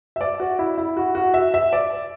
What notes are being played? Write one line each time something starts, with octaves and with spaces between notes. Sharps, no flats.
E5
D5
F#4
E4
E4
F#4
F#4
E5
E5
D5